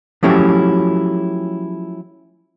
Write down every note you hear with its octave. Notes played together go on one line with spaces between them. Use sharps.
F3 F#3 A3 C#4 E4 G4